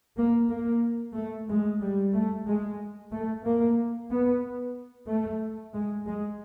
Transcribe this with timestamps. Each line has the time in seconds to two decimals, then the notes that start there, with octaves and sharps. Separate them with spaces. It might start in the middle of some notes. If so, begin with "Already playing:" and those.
0.16 A#3
0.49 A#3
1.15 A3
1.47 G#3
1.80 G3
2.13 A3
2.46 G#3
3.11 A3
3.44 A#3
4.09 B3
5.07 A3
5.73 G#3
6.06 G#3